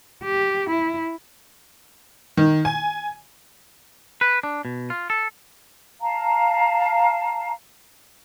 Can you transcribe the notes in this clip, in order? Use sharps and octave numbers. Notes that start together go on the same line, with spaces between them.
G4
E4
D#3
G#5
B4
D4
B2
F4
A4
F5 A5 A#5